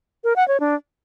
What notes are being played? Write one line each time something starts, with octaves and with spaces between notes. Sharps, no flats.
A#4
F#5
C#5
D4